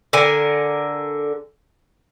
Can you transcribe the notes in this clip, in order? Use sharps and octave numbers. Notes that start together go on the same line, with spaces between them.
D3 A#4 G#5